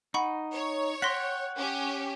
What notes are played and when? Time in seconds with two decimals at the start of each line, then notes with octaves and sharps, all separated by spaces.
0.14 D#4 F#5 B5 C#6
0.54 C#5
1.02 F#5 G5 C6 A#6 B6
1.58 C#4 G4